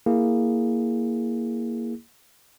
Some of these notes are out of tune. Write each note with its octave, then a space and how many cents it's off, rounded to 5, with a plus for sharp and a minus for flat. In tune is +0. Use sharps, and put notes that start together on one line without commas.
A#3 +0 E4 +0 G#4 -5